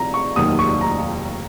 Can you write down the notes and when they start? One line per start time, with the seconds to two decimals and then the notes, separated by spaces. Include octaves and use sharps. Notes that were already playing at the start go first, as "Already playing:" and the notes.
Already playing: C2 C3 F3 A#5
0.14 C#6
0.36 F1 D#2 D#3 F#3 A#3 D#6
0.59 C#6
0.81 A#5